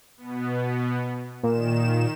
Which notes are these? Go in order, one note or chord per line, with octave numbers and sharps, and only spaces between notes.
B2 B3
A#2 D#3 E7